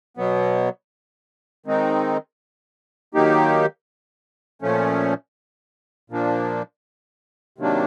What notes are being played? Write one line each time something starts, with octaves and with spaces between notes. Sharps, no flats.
B2 F#3 B3
D#3 G#3 C4 D#4
D#3 F#3 A#3 D#4 G4
A#2 F3 A3 C#4
A#2 F3 A#3 D4
C3 D#3 F#3 A#3 D4